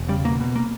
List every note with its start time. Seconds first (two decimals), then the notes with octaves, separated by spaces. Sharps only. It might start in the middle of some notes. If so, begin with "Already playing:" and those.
Already playing: E1
0.09 C#3 G3
0.24 B2 A#3
0.40 B2
0.56 A#3